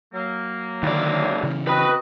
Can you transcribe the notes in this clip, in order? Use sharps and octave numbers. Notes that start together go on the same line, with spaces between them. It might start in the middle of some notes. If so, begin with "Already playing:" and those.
F#3 A#3
C#2 D3 D#3 D5
C#3 E3
C4 F#4 B4 D#5 B5